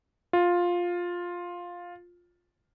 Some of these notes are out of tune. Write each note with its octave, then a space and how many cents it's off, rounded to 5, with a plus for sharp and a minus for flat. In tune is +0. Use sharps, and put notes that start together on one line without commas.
F4 +10